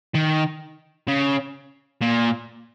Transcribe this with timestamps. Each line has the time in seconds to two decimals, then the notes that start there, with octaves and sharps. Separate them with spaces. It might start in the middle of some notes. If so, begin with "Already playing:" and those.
0.15 D#3
1.08 C#3
2.01 A#2